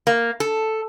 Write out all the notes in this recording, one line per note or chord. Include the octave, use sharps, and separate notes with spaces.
A#3
A4